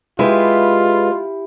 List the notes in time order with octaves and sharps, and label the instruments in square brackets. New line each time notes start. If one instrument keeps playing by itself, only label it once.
[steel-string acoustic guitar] G#3 B4 [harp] E4 G4 [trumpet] F4